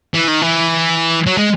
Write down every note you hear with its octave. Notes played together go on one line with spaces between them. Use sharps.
E3
D#3
E3
F#3
G#3